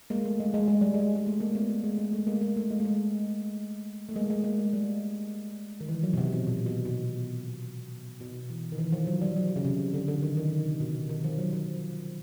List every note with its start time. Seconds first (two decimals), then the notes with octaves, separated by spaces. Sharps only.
0.10 G#3 A#3
0.25 A3
0.40 G#3
0.54 G#3
0.68 G#3
0.81 G3
0.94 G#3
1.16 G#3
1.27 A3
1.40 G#3 A#3
1.55 A3 B3
1.69 A3
1.84 G#3
1.99 G#3
2.13 A3
2.27 G#3 A#3
2.41 G#3 A#3
2.57 A3
2.71 G#3
2.80 A3
2.85 G#3
4.09 A3
4.15 G#3 A#3
4.30 G#3
4.44 G#3 A#3
4.59 G#3
4.73 G3
5.81 D#3
5.89 E3
6.03 F#3
6.13 B2
6.18 C3
6.33 B2
6.47 A#2
6.66 B2
6.85 B2
8.20 B2
8.50 E3
8.72 D#3
8.78 E3
8.92 F3
9.07 F#3
9.21 G3
9.36 F#3
9.56 C#3
9.64 C3
9.94 D3
10.08 D3
10.23 D#3
10.37 D#3
10.52 D3
10.66 C3
10.80 B2
10.95 C3
11.09 D#3
11.24 F3
11.39 F#3
11.53 F3